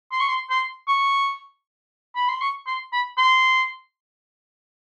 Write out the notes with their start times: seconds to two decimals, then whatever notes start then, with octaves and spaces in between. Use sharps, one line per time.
0.12 C6
0.20 C#6
0.29 C6
0.50 C6
0.88 C#6
2.15 B5
2.28 C6
2.41 C#6
2.67 C6
2.92 B5
3.17 C6